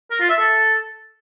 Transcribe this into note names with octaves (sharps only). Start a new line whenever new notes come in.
A#4
F4
E5
A4